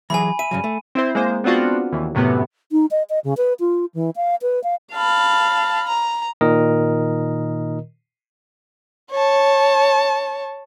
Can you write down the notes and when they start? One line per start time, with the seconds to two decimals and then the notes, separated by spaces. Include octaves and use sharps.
0.10 E3 F#3 G#4 G#5 B5
0.39 E5 D#7
0.51 G2 C#3 F#3
0.64 A3
0.95 C4 E4 C5
1.15 G#3 A#3 C5
1.44 B3 C4 D4 F4 F#4
1.92 D#2 E3
2.15 F#2 A2 C3 B3
2.72 D#4
2.91 D#5
3.10 D#5
3.24 C#3
3.37 B4
3.60 F4
3.94 E3
4.16 F5
4.42 B4
4.64 F5
4.94 F5 A5 B5
5.87 A#5
6.41 A#2 D#3 A#4 D#5
9.11 C#5 A5